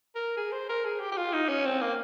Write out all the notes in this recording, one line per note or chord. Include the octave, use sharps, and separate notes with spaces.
A#4
G#4
C5
A#4
G#4
G4
G4
F4
D#4
C#4
C4
A#3